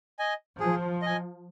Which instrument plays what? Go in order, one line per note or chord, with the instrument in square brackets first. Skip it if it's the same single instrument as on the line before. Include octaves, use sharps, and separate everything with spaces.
[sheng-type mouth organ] D#5 G#5
[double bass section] F3 [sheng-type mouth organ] G#4
[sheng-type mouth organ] D#5 G#5